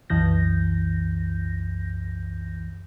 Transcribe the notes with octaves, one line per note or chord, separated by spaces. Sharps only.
C2 F#2 E3 G6 A#6